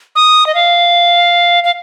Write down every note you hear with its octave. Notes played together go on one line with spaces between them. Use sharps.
D#6
D#5
F5
F5